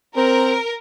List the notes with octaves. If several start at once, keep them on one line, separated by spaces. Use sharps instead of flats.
C4 A#4